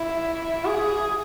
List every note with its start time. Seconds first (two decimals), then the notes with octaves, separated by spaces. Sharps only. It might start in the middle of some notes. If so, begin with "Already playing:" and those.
Already playing: E4
0.65 G#4